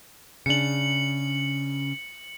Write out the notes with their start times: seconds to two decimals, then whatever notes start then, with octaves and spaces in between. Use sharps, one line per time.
0.46 C#3 D4 C#7 F#7